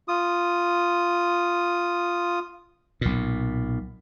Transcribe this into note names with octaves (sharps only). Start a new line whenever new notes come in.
F4 D#6
B1 A#2